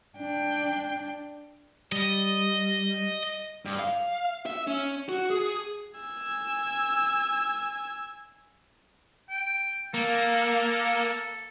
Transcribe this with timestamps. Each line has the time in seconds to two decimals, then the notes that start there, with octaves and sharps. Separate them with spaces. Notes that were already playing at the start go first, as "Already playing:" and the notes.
0.17 D4 G5
1.92 G3 D#5
3.65 G2
3.79 F5
4.46 E5
4.67 C#4
5.09 F#4
5.30 G#4
6.00 G#5 E6
9.30 G5
9.94 A#3 A4